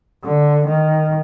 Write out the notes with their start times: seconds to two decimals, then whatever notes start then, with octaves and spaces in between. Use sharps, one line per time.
0.24 D3
0.67 D#3